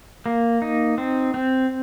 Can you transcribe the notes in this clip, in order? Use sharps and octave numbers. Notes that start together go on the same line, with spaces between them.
A#3
D#4
C4
C4